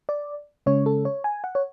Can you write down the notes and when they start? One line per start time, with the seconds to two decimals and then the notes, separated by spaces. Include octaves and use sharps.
0.09 D5
0.66 C#3 G#3 C#4 C#5
0.86 A4
1.05 C#5
1.24 G#5
1.44 F#5
1.55 C#5